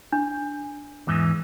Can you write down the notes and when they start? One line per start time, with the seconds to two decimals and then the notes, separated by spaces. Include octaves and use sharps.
0.12 D4
1.07 E2 G#2 E3